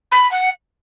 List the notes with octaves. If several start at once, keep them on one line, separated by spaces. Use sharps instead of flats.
B5
F#5